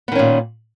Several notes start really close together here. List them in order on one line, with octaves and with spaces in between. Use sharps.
B3 D#3 C#4 A#2